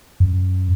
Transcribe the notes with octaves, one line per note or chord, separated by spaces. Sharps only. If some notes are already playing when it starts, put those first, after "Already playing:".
F#2